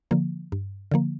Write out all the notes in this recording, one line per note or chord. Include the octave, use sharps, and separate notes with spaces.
D3 F3 A#3
G2
D3 F3 A#3